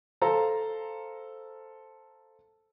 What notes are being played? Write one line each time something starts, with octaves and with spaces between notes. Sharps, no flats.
A4 C5 F5 A#5